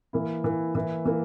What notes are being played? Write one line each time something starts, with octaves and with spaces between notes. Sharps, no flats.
E3 A#3 E4
E3 A#3 E4
E3 A#3 E4
E3 A#3 E4